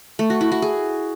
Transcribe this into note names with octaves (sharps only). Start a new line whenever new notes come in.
A3
F#4
E4
F#4
G#4